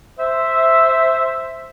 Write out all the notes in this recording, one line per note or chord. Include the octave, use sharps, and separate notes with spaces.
C5 E5